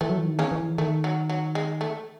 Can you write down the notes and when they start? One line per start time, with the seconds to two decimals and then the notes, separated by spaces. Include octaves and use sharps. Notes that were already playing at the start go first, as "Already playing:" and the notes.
0.01 E3 A3
0.09 F#3
0.18 E3
0.26 D#3
0.39 C#3 C#4
0.52 E3
0.78 D#3 A3
1.04 F#3
1.30 F#3
1.55 G#3
1.81 A3